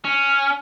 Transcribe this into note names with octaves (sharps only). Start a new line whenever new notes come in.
C#4